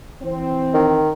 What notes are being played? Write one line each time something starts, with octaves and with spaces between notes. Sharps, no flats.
E3 C4
D#3